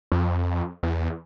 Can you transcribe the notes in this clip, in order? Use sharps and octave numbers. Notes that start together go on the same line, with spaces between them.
F2
E2